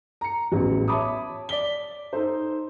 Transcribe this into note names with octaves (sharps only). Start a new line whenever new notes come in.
A#5 C#7
A1 E2 F#3
C#5 E5 A5 B5 D6 D#6
D5 B6 G7
D#4 A4 C5